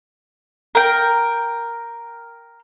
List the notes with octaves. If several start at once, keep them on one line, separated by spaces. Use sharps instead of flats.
A#4 G5